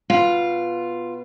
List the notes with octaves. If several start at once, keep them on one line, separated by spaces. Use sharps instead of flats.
B2 F4